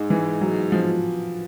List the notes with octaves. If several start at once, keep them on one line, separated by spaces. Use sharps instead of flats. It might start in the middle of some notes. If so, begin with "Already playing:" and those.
Already playing: G#2
E3
F#3
F3